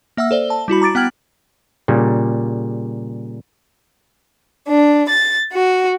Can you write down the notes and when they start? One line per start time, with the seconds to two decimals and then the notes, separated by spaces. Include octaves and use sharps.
0.17 A#3 E5 F#5 E6
0.31 A4 C5 D5 G7
0.50 A5
0.68 G3 E4 F#4 B5
0.82 A#5 D6 A6 D7
0.95 B3 F#5 G5 F6 G#6 F#7
1.88 A#2 C#3 G3
4.67 D4
5.09 A6
5.52 F#4